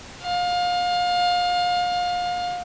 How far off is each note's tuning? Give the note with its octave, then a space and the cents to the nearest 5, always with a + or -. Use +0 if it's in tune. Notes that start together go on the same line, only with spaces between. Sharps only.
F5 +30